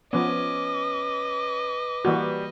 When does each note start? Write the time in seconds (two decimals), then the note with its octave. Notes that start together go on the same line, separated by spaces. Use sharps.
0.13 F3 B3 C#4 B4 D#5 D6
2.05 E3 G3 A#3 F#4